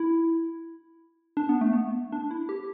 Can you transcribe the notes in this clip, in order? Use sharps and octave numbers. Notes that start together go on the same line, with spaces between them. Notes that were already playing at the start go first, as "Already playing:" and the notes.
Already playing: E4
D4
B3
A3
B3
D4
E4
G4